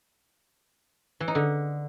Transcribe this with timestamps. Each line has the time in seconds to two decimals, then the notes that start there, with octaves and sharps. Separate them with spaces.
1.20 E3
1.28 D#4
1.35 D3